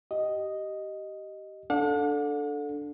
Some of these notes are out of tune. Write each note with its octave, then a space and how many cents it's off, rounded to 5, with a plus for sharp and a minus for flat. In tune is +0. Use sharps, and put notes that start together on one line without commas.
G4 -20 D#5 +0
D4 +0 A4 +0 F#5 -45